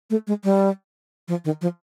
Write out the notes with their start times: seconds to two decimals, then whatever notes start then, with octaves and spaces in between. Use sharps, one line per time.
0.10 A3
0.27 G#3
0.44 G3
1.28 F3
1.45 D#3
1.62 F3